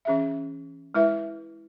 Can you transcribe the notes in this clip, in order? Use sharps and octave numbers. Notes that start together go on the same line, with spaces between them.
E3 C#4 G#4 E5
G#3 E4 B4 E5